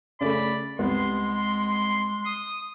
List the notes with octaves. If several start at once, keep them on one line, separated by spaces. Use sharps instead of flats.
C#3 A3 D5 B5
C2 G3 G#3 B3 C6
D#6